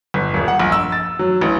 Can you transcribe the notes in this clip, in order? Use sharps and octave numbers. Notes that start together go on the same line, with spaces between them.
G1
D#1
F#5
A#1
E6
A6
F#3
A1